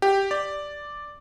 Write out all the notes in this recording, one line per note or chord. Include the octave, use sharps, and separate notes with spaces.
G4
D5